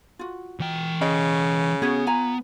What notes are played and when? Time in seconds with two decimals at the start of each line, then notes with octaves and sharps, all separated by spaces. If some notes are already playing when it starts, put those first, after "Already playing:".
0.19 F4 F#4
0.60 E3 G5
1.01 C#3 D#5
1.82 B3 C#4 F#4 G#4
2.07 F4 G#5 A#5